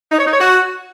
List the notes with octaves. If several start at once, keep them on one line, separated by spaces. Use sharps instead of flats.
D#4
C#5
D#4
C#5
F#4